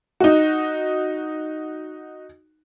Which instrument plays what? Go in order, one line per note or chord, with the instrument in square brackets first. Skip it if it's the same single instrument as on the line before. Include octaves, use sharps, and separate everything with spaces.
[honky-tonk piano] D#4 F#4